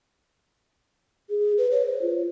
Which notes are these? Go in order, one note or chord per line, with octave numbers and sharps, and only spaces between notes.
G#4
B4
C#5
C5
F4